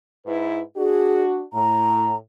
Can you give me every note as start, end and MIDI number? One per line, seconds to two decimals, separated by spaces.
0.25 0.60 44
0.25 0.60 64
0.25 0.60 71
0.76 1.42 62
0.76 1.42 66
0.76 1.23 68
1.53 2.14 45
1.53 2.15 82